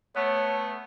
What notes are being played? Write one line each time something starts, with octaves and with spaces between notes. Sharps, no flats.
A3 B3 C#5